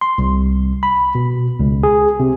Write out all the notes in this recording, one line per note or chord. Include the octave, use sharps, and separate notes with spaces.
C6
C2
B5
B2
C#2
G#4
C3